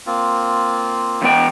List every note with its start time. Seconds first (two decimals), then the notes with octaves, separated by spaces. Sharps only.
0.06 A#3 C4 F4
1.22 E2 B3 G5